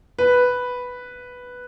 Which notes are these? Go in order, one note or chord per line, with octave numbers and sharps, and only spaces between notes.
B4